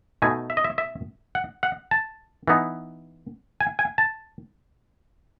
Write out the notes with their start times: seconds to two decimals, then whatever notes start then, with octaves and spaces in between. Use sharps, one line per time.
0.22 B2 A3 D#4 G#5
0.50 E5
0.57 D#5
0.64 E5
0.78 E5
1.35 F#5
1.63 F#5
1.91 A5
2.48 E3 B3 D#4
3.60 G#5
3.79 G#5
3.98 A5